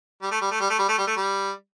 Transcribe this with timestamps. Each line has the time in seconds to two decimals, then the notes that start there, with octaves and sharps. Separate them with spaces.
0.22 G3
0.32 A3
0.41 G3
0.51 A3
0.60 G3
0.70 A3
0.79 G3
0.89 A3
0.98 G3
1.07 A3
1.17 G3